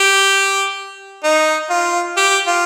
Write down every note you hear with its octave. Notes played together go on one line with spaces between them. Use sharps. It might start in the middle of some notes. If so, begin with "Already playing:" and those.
Already playing: G4
D#4
F4
G4
F4